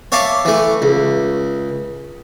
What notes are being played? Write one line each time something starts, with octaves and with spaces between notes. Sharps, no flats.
C#5 E5 F5 A5 D6
E3 A3
C#2